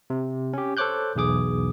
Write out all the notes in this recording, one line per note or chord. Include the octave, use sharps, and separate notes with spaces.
C3
C#4 G4
A4 C5 C#5 D6 F#6 G6
B1 E2 G#4 D6 D#6